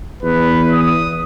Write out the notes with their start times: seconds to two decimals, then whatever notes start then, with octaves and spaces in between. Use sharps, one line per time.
0.23 E2 B4
0.71 D#6